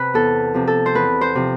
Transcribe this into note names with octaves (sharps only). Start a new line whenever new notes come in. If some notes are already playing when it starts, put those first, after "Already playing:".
Already playing: C3 B4
E2 A4
C3 F3
A4
C5
E2 B4
C5
C3 F3